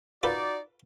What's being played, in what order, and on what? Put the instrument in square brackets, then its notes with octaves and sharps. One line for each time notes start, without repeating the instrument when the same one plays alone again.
[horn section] D#4 F#4 D5 [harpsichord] F4 A4 B4